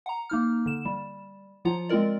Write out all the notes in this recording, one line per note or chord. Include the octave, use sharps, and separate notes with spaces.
F#5 A#5
A#3 D#4 F6
D3 E7
G3
F3 F#3 F4 F#5 A#5
G#3 C4 F4 A#4 D5